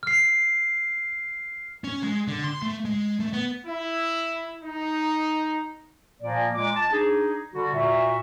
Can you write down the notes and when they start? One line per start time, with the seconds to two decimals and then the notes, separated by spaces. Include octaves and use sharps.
0.03 F6 C7
1.84 C#4
2.03 G#3
2.28 D3
2.44 C6
2.62 A3
2.85 G#3
3.20 A3
3.33 B3
3.65 E4
4.63 D#4
6.22 A#2 F3 A#3 D5
6.55 A#2 G#3 D6
6.76 A5
6.92 D4 D#4 G#4
7.54 D3 G3 F#4
7.74 A#2 F#4 E5